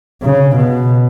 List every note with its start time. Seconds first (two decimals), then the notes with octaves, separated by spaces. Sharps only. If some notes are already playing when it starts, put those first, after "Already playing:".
0.23 C#3
0.56 B2